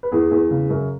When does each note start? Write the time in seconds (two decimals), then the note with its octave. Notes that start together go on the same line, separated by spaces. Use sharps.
0.03 B4
0.12 E2 G#4
0.31 E2
0.51 C#3
0.70 F#2